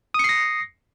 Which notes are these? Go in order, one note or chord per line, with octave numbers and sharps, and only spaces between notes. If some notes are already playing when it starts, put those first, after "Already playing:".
D#6 A#6 C7 C#7